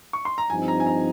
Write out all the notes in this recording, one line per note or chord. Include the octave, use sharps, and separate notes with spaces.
C#6
C6
A#5
G2 F3 C4 D#4 G#5
A#5
G#5
A#5